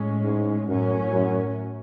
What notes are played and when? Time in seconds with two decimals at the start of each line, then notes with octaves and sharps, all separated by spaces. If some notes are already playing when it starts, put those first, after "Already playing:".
Already playing: A2 G#3 C#4
0.24 G#2
0.68 F#2 A2 F#3 C#4
1.12 F#2